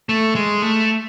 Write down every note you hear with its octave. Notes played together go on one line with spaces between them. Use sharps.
A3
G#3
A3